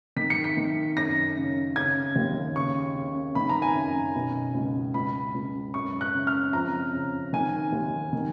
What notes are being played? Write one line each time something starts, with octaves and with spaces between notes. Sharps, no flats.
D#3 B6
C#7
B6
D#3
F#2 A#6
C#3
C#3 G#6
D#2
C#3 C#6
C#3
D#3 B5
A#5
G#5
F#2
B2
C#2
C#2 B5
C#2
F#2 C#6
F#6
C#3
F6
F2 A#5
C#3
D#3 G#5
D#2
D#3